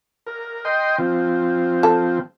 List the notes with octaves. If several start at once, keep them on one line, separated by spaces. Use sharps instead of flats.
A#4
D#5 G5 C6
F3 C4
A4